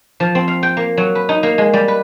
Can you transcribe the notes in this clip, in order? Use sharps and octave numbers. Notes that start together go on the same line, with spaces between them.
F3
C4
F5
G5
A#3
F#3
B4
D#4
A#3
G#3
G3
B4